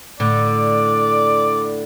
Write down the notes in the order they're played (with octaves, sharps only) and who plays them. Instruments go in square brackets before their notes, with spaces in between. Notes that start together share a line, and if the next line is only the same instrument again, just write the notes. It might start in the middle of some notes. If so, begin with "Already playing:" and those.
[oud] A2 D3 [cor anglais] D5